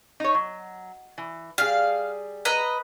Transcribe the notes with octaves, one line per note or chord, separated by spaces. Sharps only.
D#4 C#5
F#3
E3
G3 G#4 F5
B4 D#5 A#5